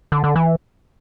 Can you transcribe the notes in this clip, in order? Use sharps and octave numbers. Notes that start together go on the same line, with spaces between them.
D3
D3
E3